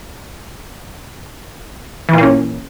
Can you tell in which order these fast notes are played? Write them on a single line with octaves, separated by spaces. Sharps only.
E3 A#2 A#3 C#4